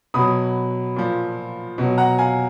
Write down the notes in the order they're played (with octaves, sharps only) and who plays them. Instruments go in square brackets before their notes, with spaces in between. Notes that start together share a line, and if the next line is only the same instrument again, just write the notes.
[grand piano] B2 F#3 B5 D#6
A#2 F3
B2 F#3
F#5 A#5
F5 G#5